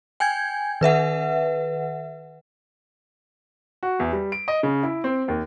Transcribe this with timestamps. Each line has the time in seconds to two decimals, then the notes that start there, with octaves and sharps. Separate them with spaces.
0.20 G5 G#5 G6 G#6
0.81 D#3 B4 E5 F#5
3.83 F#4
3.99 E2
4.13 G3
4.32 D7
4.48 D#5
4.63 C#3
4.83 E4
5.04 C4
5.28 D#2